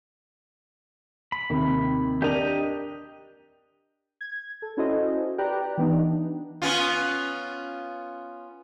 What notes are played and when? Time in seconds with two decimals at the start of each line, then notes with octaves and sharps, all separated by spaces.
1.32 B5
1.50 D#2 C3
2.22 D4 G4 A#4 D#5 F7
4.21 G#6
4.62 A4
4.77 C#4 E4 F#4 A4 C5 D#5
5.38 G4 B4 D5 G5 A#5 F#6
5.77 E3 B3 D4 D#4
6.62 B3 C#4 F4